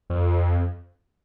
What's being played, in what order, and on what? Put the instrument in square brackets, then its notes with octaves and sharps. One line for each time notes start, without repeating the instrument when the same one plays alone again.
[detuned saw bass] F2